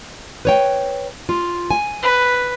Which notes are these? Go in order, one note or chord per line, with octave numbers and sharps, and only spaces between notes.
B4 C#5 G5
F4
G#5
B4